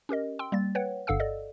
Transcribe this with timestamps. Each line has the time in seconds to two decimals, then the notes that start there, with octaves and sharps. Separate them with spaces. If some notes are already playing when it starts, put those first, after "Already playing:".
0.09 C#4 G4 A#4 D#5
0.39 G5 C6 E6
0.52 G3 A#3 A6
0.75 B4 C#5 F#5 G5
1.07 G1 G2 A4 F5 F#5 E6
1.20 A4 D5 D#5